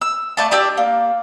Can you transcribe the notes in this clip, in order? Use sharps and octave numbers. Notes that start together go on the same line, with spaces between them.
E6
A3 D5 A5
D4 G4 D5 E6
A#3